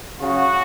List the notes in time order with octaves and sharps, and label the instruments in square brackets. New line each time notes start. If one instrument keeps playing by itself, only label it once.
[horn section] C#3 F#3 C#4 F#4